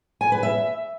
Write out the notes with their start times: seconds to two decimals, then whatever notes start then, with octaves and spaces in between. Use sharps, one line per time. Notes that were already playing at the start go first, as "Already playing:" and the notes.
0.21 G#5
0.32 B4
0.43 E5